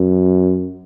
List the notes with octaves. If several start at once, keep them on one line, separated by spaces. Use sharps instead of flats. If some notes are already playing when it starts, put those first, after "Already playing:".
Already playing: F#2